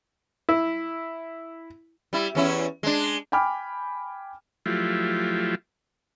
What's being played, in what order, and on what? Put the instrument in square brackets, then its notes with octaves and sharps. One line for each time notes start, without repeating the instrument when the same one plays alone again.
[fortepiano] E4
[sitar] G3 E4
E2 C#4 E4
G#3 D4
[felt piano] G5 G#5 B5 D6 F6
[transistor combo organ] F3 F#3 A3 E4 F4 G4